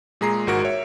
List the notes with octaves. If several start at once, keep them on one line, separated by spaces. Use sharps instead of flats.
A#2 G#3 G#4 A#5 C7
G#1 G#2 F#4 A#4 D7
C#5 E5